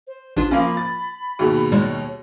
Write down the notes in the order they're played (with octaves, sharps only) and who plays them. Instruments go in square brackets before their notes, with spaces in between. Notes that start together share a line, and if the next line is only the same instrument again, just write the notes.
[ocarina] C5
[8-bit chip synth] A1 D4 F4
[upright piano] F3 A#3 F4 [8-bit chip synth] C#4 [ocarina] B5
[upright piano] A6
[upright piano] D#2 B2 [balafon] F#4 G#4
[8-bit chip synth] A2 G3 G#3 [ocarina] C#5